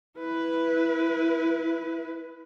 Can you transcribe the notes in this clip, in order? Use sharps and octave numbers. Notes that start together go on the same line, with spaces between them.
E4 B4